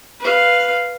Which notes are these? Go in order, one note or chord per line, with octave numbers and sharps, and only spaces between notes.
B4 F5